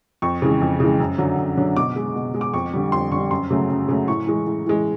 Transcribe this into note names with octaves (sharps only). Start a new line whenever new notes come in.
F2 C#6
C#3 E3 G#3
F2
C#3 E3 G#3
F#2
D3 F#3
F#2
D3 F#3
B2 D6
G#3
B2
G#3
D6
F2 C#6
D3 G3
F2 C6
D3 G3 C#6
F#2 C6
C#3 F#3 A3
F#2
C#3 F#3 A3
A2 C#6
E3 G#3
A2
E3 G#3